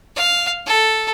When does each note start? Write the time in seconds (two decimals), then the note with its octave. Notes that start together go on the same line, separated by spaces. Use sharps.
0.16 F5
0.66 A4